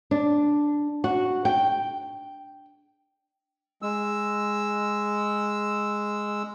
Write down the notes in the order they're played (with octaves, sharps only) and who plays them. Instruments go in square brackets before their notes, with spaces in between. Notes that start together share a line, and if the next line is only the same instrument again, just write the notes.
[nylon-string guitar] D4
F#4
G5
[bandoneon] G#3 E6